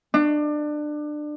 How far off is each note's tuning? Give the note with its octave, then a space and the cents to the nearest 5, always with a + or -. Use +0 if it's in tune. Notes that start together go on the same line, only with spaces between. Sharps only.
D4 +25